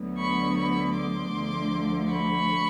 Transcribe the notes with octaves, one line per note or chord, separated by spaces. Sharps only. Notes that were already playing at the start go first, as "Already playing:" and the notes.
Already playing: D2 D3 F#3 B3
B5 C#6
B5 C#6
C6 D6
D2 D3 F3
B5 C#6